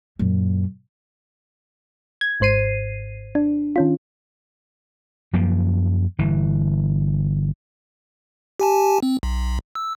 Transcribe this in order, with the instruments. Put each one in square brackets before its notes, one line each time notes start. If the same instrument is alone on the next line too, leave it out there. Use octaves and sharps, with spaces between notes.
[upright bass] F#2 A#2
[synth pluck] G#6
G#1 G#2 C5 C7 D#7
D4
D#3 C#4 F4
[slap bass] F#2 F3 A#3
G1 E3
[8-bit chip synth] G4 G#5 A5
C4
B1
E6